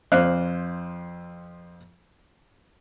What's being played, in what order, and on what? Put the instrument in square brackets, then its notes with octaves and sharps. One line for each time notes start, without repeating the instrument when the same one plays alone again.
[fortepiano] F2 C4 C5 D5 F5 F#6